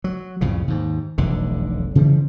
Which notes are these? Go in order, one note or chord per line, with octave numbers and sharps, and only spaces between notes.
F#3
C2 F2 A2 C#3
D#2 G#2
F1 B1 E2 D3
C#3 E3 F3 G3